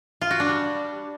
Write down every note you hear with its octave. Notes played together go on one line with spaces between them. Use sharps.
F4
F#4
D4
G3